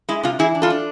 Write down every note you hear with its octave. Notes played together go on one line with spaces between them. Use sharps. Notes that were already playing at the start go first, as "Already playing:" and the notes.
G#3 E4
C3 F4
E3 E4 G#4
D4
F4 A4
D4